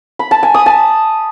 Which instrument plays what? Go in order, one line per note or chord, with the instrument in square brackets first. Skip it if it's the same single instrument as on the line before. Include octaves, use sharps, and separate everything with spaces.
[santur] B5
A5
G#5
D#6
A5